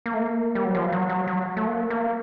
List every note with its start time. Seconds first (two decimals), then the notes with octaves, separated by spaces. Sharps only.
0.06 A#3
0.14 A3
0.21 A#3
0.55 G3
0.65 F#3
0.75 F3
0.92 F#3
1.09 F#3
1.27 F#3
1.57 A3
1.67 A#3
1.90 A#3